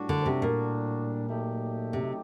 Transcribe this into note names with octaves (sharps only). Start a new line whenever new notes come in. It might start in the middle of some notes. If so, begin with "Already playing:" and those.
Already playing: A2 G3 D4 F#4 A4
D3
C3
A#2
F#3 A3 D#4 G4
C3